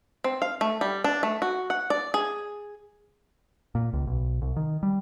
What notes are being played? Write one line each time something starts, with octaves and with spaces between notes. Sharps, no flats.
C4
F5
A3
G3
D4
A3
F#4
F#5
D5
G#4
A#2
C#2
B1
C2
D#3
G3